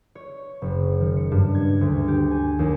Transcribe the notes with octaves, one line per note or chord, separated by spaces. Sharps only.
C#5
F#1
D#3
C#7
G2
G#6
D2
G4
G#5
D#2